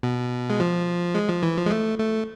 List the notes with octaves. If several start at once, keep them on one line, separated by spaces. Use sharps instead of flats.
B2
G#3
F3
G#3
F3
E3
F3
G#3
A3
A3